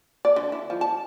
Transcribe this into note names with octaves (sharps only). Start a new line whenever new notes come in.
D5
D3
E4
F3
A5